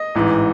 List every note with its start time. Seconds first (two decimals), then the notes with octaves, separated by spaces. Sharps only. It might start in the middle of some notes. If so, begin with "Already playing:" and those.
Already playing: D#5
0.15 A1 G#2 E3